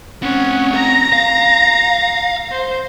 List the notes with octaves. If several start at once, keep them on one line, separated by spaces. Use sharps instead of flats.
C4 C#4 F#5 F#6
A#5 A#6
F5
C5